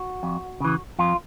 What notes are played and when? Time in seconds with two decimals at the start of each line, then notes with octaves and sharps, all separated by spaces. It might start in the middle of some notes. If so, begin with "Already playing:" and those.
Already playing: F#4
0.23 F2
0.60 C#3 E3
0.99 F2 F4